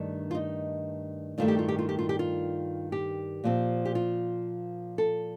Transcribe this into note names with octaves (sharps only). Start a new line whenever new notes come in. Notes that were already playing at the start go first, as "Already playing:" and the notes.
Already playing: G2 D#3 A3 D4
F4
D#4
G2 D#3 A3 F4
G4
F4
G4
F4
G4
F4
G4
F4
G4
A#2 F3 C4
G4
F4
A4